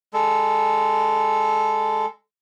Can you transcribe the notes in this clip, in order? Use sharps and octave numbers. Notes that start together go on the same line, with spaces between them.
G#3 A4